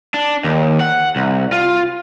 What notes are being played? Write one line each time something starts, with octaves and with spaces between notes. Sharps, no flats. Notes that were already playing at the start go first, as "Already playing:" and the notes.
D4
D#2
F#5
C2
F4